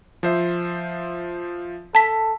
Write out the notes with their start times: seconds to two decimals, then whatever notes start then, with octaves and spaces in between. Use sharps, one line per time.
0.23 F3 C5 E5
1.95 A4 A5 B6